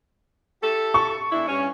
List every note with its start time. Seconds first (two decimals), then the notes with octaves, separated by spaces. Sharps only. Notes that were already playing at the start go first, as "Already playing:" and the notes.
0.62 E4 G4 A4
0.94 C#6
1.31 E2 D4 E4
1.48 G2 C#4